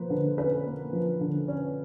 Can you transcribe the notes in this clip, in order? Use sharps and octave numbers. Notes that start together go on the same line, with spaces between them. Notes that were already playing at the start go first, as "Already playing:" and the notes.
Already playing: F3 A#3 B4 C5
D3
C#4 B4
A#3
F3
D3
C#4